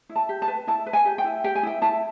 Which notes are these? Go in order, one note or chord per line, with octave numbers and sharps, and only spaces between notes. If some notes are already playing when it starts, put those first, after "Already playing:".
E4
A5
G4
A5
B4
E4 A5
B4
G#5
G4
G5
E4
G4 G5
G#5
E4 G5
E4 A5